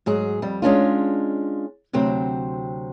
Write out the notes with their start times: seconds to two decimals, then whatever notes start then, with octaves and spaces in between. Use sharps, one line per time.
0.06 G#2 F#3 G#4
0.42 F2 G3
0.62 G#3 C#4 D4 F4
1.93 D2 C3 F#3 C4